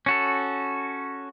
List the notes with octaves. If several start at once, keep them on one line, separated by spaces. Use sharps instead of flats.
C#4 F#4 A4